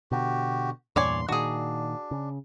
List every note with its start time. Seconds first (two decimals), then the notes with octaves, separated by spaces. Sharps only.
0.11 B2 D3 F#4 G4
0.96 E2 G2 A#2 C#5 D5 G#5 C6
1.29 A#2 D#3 D4 F#4 G#4
2.11 C#3